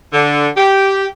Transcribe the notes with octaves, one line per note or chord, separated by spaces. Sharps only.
D3
G4